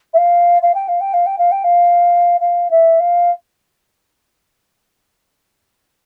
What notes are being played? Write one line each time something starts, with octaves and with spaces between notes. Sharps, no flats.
E5
F5
F5
G5
F5
G5
F5
G5
F5
G5
F5
F5
E5
F5